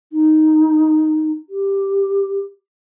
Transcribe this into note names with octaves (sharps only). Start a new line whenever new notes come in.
D#4
G4